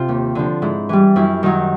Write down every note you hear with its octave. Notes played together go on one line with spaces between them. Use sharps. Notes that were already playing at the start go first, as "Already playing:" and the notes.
Already playing: C3 F4
D#2
D3 F3
G#2 E4
E3 G3
F#2 E4
D#3 F#3 D#4